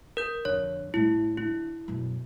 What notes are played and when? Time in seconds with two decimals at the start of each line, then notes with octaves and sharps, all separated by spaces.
0.17 A#4 G6
0.45 F2 D3 C#5
0.94 A2 G3 E4
1.37 D3 E4
1.88 F#2 B2